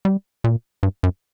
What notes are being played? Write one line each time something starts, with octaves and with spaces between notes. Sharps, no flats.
G3
A#2
G2
F#2